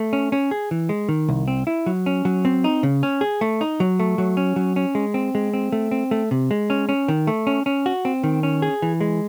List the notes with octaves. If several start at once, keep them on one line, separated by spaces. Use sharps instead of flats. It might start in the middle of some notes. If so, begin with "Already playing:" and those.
Already playing: A3
C#4
C#4
G#4
E3
G#3
D#3
C2
C4
E4
F#3
C#4
F#3
C4
D#4
C#3
C#4
G#4
A3
D#4
F#3
A3
F#3
C#4
F#3
C#4
G#3
C4
G#3
C4
A3
C4
A3
C3
G#3
C#4
C#4
D#3
A3
C#4
C#4
F#4
C4
D#3
C#4
G#4
E3
G#3